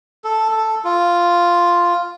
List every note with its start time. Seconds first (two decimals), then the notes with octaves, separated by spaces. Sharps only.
0.24 A4
0.51 A4
0.84 F4